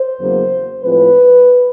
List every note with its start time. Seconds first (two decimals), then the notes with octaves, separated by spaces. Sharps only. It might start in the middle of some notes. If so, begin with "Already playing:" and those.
Already playing: C5
0.19 E2 C#3 F#3 A#3
0.83 A2 F3 G#3 C4 B4